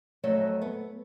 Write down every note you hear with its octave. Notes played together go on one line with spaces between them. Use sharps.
F2 F#3 A3 D#5 E5
B3